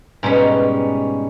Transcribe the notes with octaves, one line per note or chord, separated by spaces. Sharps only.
G#2 B2 G3 C#4 D#4